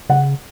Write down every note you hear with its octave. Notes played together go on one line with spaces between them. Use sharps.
C#3 F#5